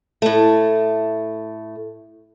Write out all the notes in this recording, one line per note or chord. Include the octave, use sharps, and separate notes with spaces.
A2 A3